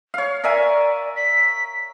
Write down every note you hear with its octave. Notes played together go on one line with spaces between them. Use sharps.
C#5 F5
A#4 D5 E5 G#5
B6